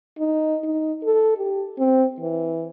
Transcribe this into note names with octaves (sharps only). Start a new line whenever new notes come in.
D#4
D#4
A4
G4
C4
E3